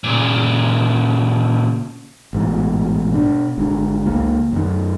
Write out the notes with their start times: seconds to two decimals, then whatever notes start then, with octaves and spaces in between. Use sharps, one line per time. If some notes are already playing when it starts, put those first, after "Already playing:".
0.04 A#2 C#3
2.33 A1 G#2 B2
3.13 B2 D4
3.57 G#1 G#2 D3
4.06 C#2 A#3
4.52 F#2 D#3